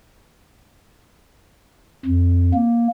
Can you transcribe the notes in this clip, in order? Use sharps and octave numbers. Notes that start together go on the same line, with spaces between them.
F2
A#3